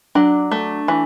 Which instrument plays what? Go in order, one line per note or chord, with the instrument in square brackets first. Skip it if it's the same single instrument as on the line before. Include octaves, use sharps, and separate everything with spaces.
[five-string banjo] F#3 [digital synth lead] D4
[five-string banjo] A3
E3